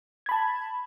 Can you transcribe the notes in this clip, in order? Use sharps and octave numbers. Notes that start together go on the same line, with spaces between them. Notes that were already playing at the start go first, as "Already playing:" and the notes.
A5 B5 G#6